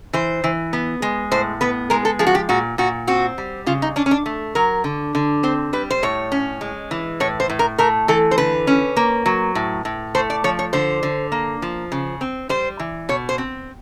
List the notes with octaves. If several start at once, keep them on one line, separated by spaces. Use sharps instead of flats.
E3 C5
E3
B3
G#3
A2 C5
B3 B4
G#3 A#4
A4
F3 G#4
F#4
G4
A#2 F#4
A#2 F#4
C4 F#4
G3
C#3 F4
D#4
C#4 D4
C#4
D4
A3
F#3 A#4
D3
D3
C4 C5
G3 B4
C5
A2 C#5
C#4
G#3
E3
A2 C#5
C5
A2
A#4
A3 A#4
E3 A4
C5
D3 B4
C#4
A#3
F#3
A2
A2
A3 C5
D5
F3 C#5
C#5
D3 C5
D3
A#3
F3
C#3
C4
G3 C5
E3
B2 C#5
C5
C4